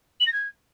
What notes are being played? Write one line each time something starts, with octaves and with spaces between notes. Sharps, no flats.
F#7
A#6
G#6